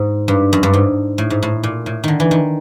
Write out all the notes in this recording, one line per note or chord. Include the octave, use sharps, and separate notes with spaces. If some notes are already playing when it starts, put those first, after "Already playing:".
Already playing: G#2
G2
F#2
G2
G#2
A2
G#2
A2
A#2
A2
D3 D#3
E3
D#3